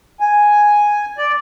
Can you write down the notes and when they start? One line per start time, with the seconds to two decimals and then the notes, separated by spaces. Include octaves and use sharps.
0.20 G#5
1.18 D5